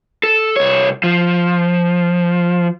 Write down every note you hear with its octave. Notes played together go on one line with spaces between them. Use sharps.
A4
C2 C#5
F3